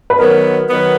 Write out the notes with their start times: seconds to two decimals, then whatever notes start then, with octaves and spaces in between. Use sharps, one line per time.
0.10 B4
0.19 D#3 F#3 B3 A#4
0.69 D#3 F#3 B3